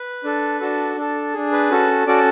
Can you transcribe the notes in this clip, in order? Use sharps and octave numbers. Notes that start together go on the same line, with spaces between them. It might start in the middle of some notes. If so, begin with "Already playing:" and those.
Already playing: B4
D4 A4
D4 F#4 A4
D4 A4
D4 G#4
B4
C#4 F#4 A4
C#4 F#4 A4 D5